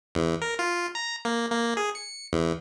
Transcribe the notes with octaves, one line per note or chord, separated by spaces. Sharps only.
E2
A#4
F4
A#5
A#3
A#3
G#4
C#7
E2